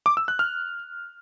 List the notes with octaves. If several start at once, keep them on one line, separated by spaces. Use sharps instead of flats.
D6
E6
F#6
F6